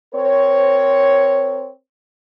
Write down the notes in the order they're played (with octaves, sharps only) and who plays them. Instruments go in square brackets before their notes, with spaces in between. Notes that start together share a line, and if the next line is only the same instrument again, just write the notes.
[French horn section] C4 A#4 C5 C#5